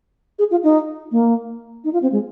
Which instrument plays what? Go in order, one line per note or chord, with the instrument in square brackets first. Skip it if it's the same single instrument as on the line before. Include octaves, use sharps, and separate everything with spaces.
[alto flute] G#4
F4
D#4
A#3
D#4
F4
C4
G#3